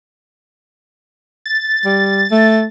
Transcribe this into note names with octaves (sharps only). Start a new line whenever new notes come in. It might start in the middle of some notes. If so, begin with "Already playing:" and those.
A6
G3
A3